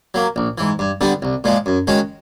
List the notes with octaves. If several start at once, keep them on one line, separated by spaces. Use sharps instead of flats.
F#3 A#3
A#1
G#2 E3
G2
D3 G3 B3 D4
C2
A#2 F3 G#3
F#2
D#3 G#3 C#4 F#4